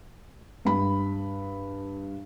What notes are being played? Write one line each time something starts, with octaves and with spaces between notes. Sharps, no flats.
G2 B5